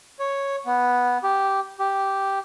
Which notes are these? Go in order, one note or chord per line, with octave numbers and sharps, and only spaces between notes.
C#5
B3
G4
G4